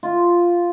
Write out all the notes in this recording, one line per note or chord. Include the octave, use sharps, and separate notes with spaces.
F4